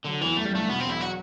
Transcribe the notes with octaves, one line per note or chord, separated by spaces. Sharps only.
D3 F#3
E2 E3
F#2 A3
G3
G1 A3
B2 B3
C4
E1 E4
F#3 F#4